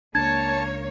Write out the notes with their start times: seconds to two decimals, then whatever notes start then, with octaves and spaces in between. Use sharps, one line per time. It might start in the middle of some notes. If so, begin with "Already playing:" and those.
0.15 C#2 A#3 D4 C#5 A5 G#6